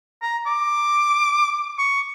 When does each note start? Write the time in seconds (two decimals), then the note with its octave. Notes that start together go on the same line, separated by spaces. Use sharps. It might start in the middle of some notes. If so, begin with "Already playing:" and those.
0.22 A#5
0.46 D6
1.79 C#6